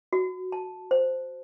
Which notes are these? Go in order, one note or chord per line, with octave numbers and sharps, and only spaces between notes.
F#4
A5
C5